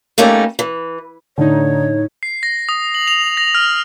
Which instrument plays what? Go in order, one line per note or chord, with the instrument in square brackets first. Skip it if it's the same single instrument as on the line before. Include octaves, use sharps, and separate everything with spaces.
[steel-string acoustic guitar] G3 A3 A#3 C#4 D#4 G4
E3
[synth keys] A2 D#4 [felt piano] D3 [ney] C#5
[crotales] C7
A#6
D#6
F#7
F7
A#6
F6